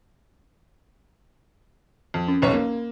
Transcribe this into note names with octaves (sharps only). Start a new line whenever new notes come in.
F2
C#4
F1 B1 C#5
A#3